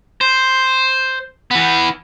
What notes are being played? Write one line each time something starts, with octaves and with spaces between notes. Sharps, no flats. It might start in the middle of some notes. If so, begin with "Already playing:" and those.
C5
E3 B3